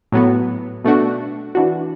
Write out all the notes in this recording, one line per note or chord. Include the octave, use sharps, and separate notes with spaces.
A2 F#3 B3 F#4
B2 A3 D4 F#4
E3 D4 F#4